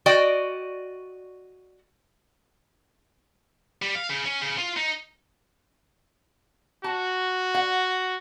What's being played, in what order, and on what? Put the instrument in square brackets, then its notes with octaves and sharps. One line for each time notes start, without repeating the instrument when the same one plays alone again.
[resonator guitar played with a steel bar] F#4 D5 D#5 G5
[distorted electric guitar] G3
F5
C#3
C#4
C#3
F4
D#4
[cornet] F#4 [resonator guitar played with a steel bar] A5
[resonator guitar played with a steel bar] F#5